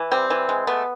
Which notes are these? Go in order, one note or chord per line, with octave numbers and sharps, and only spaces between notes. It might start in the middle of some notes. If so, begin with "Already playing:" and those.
Already playing: E3
G3 C4
E3
G#3
A3 B3